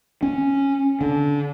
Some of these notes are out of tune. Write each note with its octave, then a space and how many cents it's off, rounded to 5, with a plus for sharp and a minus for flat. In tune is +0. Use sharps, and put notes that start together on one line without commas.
C#4 -5
D3 -25